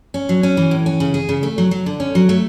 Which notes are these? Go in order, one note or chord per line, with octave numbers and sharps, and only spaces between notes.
C#4
F#3
C#4
E3
A2
C#4
C#3
G#4
C#3
A3
F#3
F#3
D3
C#4
F#3
A3